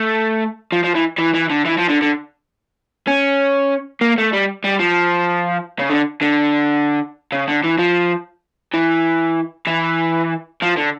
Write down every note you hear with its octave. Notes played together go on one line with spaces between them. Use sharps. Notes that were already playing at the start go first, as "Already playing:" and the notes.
Already playing: A3
F3
F3
E3
E3
E3
D3
E3
F3
D3
D3
C#4
A#3
A3
G3
G3
F3
C#3
D3
D3
C#3
D3
E3
F3
E3
E3
F3
D3